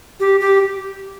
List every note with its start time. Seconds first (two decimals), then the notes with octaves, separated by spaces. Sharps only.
0.20 G4
0.40 G4